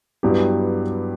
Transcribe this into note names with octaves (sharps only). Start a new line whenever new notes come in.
G2 F#3 B3 E4 G4